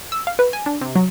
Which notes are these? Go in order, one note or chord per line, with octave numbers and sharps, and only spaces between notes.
E6
F5
B4
G#5
D4
C3
F#3